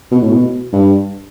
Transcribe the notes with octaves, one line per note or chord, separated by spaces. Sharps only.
B2
A2
B2
G2